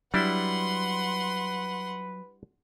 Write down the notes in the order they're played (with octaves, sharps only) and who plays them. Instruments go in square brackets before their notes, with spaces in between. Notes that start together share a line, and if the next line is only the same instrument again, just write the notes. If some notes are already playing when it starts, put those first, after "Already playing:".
[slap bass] F#3 [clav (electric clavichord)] G3 D4 E4 [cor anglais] B4 [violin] F#5 C6